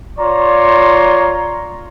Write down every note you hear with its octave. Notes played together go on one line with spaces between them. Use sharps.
F4 C#5 D5 A#5 C6